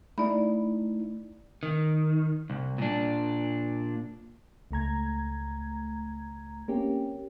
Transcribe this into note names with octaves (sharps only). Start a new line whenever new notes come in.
A3 D#4 E4 D5 B5
D#3
C2
A#2 D4
C#2 A3 A#5 G#6
A#3 C4 C#4 G4